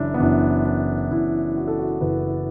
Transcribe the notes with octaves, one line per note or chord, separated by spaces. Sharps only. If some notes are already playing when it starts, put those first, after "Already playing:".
Already playing: F#1 F#2 E3 D4 E4
B3
F#1 F#2 E3 D4
D4
F#1 F#2 E3 E4
F#4
A4
F#4
F#1 F#2 E3 B4